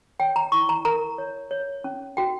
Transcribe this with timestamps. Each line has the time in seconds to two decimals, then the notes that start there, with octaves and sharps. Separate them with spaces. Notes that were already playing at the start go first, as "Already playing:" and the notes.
0.19 C#5 G5
0.36 A#5
0.52 E4 C#6
0.69 A#5
0.85 A#4 A#5
1.18 C#5
1.51 C#5
1.84 C#4
2.17 F#4 G5